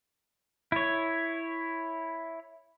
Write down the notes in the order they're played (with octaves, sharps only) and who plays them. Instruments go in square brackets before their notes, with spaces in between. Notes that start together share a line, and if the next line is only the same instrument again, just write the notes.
[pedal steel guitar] E4 C#5